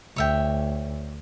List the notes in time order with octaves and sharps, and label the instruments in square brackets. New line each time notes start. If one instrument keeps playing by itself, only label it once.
[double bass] D2 [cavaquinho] C#5 E5 G5